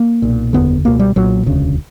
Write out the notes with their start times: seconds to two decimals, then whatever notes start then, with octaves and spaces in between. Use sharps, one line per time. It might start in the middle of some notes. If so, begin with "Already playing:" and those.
Already playing: A#3
0.22 B1 A#2
0.53 F#1 E2 D3 B3
0.84 C#2 B2 A#3
0.99 G3
1.16 B1 A#2 F#3
1.46 E1 D2 C#3